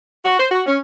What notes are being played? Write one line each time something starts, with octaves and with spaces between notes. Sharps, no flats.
F#4
C5
F#4
C#4